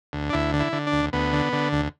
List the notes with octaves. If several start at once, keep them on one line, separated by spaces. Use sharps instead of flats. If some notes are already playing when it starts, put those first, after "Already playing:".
D2
D4
D2 E4
D3
E4
D3
D4
D2
D2 B3
D3
D3
D2